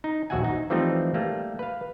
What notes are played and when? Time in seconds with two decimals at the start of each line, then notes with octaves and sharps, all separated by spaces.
0.04 D#4
0.30 A#1 D#2 F#4 E5 F#5 G#5
0.44 D#4
0.70 E3 F3 G3 A3 C4 D#4
1.14 G3 A3 A#3
1.59 B4 F5